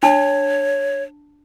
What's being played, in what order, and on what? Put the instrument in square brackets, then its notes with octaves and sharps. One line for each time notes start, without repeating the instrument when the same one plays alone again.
[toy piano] D4 A5 [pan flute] C#5